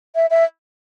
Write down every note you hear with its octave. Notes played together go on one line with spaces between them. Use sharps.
E5
E5